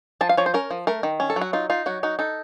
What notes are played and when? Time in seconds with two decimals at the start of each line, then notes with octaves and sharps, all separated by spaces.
0.21 F3 A5
0.29 F5
0.37 F3 C#5
0.46 C5
0.54 C#4 A#4
0.71 F3
0.87 A3 A#4
1.03 D#3
1.20 C#4
1.30 A4
1.36 F#3
1.41 F#4
1.53 D#4 F4
1.70 D#4 F4
1.86 F#3 F#4
2.03 D#4 F#4
2.19 D#4 A4